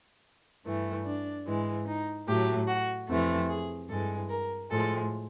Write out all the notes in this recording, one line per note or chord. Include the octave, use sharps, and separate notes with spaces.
G2 E3 A3
D4
G#2 E3 G#3
D#4
A2 F#3 A3 G4
F#4
F2 C3 E3 A3
G#4
G2 E3 G#3 A4
A#4
A2 F3 G#3 A4